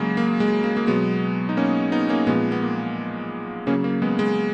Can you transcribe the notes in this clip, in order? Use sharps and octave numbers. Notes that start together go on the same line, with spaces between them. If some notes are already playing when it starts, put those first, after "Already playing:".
Already playing: C#3 F#3 G#3 A#3
A#3
G#3
A#3
A#3
B2 F#3 G#3 B3
D#4
A#3 C#4
B3 D#4
A#3 C#4
A#2 F3 G#3 B3
B3
A#3
C#3 F#3 A#3 C#4
A#3
G#3 B3
G#3